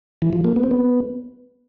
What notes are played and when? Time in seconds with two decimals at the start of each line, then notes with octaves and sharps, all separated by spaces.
0.22 E3
0.33 F3
0.45 A#3
0.56 B3
0.63 C4
0.71 B3